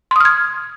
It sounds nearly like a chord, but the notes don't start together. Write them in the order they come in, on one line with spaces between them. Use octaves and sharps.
C6 D#6 F6 G#6